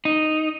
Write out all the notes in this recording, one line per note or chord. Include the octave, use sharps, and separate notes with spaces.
D#4